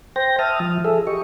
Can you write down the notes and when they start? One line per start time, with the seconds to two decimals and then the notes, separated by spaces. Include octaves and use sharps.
0.16 C5 G5 A#6
0.39 E5 A5 D#6 F6
0.60 F3
0.85 G#4 A4 E5
1.07 G4 D#5 C#6